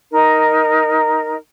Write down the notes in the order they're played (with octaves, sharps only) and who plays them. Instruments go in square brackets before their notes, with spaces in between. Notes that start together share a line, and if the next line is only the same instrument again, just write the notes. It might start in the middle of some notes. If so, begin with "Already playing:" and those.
[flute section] D#4 A#4